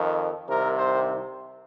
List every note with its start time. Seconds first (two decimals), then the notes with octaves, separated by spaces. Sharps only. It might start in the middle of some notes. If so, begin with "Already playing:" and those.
Already playing: F2 D#3
0.48 C2 C3 D#3 A#4
0.77 C5